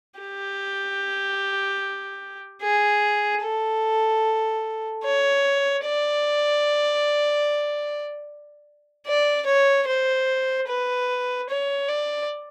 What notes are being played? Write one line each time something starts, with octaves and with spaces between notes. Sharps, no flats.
G4
G#4
A4
C#5
D5
D5
C#5
C5
B4
C#5
D5